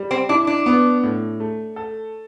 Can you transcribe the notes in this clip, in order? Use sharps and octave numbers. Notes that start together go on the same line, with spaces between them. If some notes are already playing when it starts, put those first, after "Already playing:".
Already playing: G3
C4
D4 E4
D4
B3
A2
A3
A4